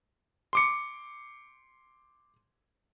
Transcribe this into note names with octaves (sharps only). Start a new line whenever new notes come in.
C6 D6 C#7